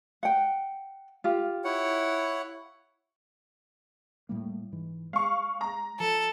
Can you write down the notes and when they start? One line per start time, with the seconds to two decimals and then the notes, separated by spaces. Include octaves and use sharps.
0.23 F#5 G5
1.24 F4 G4
1.65 E4 C#5 F#5
4.29 A2 G3 A#3
4.72 G#2 E3
5.13 G#3 F5 C#6
5.61 A#5
6.00 F3 A4